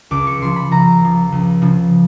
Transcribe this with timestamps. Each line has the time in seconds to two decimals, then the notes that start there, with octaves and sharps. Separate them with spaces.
0.11 C#2 D6
0.27 C#6
0.42 C#3 F3 C6
0.56 B5
0.71 C#2 A#5
1.02 C#3 F3
1.32 C#2
1.62 C#3 F3